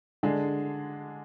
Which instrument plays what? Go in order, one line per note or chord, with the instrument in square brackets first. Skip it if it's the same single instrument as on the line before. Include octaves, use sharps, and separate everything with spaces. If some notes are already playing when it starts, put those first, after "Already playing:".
[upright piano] D3 G#3 D4 G#4